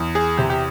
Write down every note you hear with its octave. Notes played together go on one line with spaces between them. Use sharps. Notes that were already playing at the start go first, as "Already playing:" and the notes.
Already playing: E2
G#4
C3 G4
G4